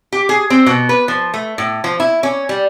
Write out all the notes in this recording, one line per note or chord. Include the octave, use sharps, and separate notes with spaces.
G4
G#4
C4
B2
B4
F3
A3
A2
F3
E4
C#4
G3